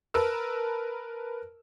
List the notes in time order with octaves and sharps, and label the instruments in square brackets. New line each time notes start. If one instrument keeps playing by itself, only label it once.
[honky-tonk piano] A#4 B4 A5 E6